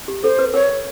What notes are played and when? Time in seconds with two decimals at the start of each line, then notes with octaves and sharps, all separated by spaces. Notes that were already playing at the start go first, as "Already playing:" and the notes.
0.08 G4
0.23 A4 C5
0.39 B4
0.54 A#4 C#5